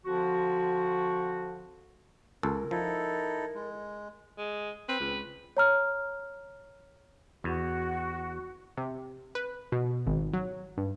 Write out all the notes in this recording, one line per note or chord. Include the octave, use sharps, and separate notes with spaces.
D3 F3 C4 F#4
C#2 A4 A#4
F3 D#4 E4 A4
G#3
G#3
C4 B4
C#2
C#5 A#5 F6
E2 F#4
C3
B4
B2
G#1
F#3
G2